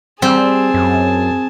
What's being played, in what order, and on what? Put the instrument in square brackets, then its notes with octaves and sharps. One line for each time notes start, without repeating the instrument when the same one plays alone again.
[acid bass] G3 [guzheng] C4 [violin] G#4 A5
[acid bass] F#2